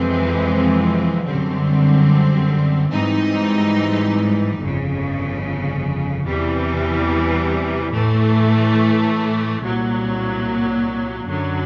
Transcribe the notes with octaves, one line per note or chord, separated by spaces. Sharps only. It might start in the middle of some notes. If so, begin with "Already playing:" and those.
Already playing: F2 C3 E3 G#3 C4
F#2 D3 G3 C4
G#2 E3 G3 C4 D#4
G1 F2 C#3
E2 C3 E3 G3
A2 E3 A3
C2 A#2 F#3
F#2 D3 F#3